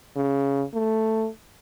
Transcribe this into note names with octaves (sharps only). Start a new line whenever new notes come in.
C#3
A3